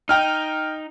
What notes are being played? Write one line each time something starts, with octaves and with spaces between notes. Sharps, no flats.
D#4 G5 F6